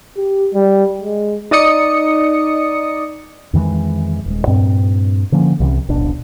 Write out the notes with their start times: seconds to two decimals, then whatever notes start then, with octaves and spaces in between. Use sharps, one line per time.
0.17 G4
0.54 G3
1.01 G#3
1.51 D#4 D5 D#5 D#6 C#7
3.53 F2 D#3 E3 G#3
4.26 D#1 G#3
4.47 G2 A#2 C4
5.32 D3 F3 A#3 C#4
5.60 C2 C3 E3 C#4
5.89 D1 A1 B2 D4